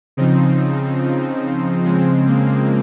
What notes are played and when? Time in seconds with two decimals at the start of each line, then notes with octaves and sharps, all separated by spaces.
0.17 C#3 F3 C4 D#4
1.02 C#3 F3
1.85 C#3 F3 G#3 C4
2.27 A#3